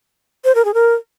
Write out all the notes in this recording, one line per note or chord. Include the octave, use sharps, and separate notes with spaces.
C5
A#4
G#4
A#4